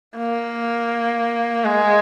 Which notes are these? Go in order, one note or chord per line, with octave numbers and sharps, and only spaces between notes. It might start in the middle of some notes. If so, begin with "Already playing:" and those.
A#3
G#3